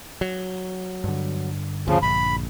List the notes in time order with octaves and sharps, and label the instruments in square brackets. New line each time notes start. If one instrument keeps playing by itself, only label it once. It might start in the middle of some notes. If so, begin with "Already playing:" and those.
[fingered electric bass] F#3
[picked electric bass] G2 D3
[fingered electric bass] D2 [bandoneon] C#3 F3
[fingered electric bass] A#1 [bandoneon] B5